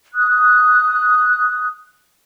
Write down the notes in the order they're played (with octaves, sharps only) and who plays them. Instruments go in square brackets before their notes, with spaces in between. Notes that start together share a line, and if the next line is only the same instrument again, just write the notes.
[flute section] D#6 F#6